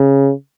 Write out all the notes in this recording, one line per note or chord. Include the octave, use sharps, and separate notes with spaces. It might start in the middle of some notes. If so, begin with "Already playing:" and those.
Already playing: C#3